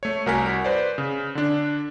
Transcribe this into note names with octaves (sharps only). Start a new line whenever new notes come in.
A3 C#5
C2 F#4 A#4 F#5 G#5 B6
B4 C5 D5
C#3
D3 D4